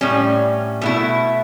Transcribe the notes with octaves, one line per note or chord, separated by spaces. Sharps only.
A2 G3 C#4
B2 A3 E4